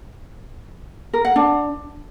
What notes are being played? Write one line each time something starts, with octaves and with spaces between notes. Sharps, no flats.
A#4
F#5
D4